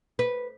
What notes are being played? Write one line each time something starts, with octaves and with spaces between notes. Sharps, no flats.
B4